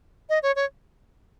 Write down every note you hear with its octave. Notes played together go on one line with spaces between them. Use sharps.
D#5
C#5
C#5